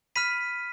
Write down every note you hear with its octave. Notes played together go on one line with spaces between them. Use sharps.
B5 F6 B6 D#7